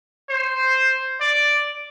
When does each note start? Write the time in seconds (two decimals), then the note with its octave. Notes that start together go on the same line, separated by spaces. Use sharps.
0.29 C5
1.20 D5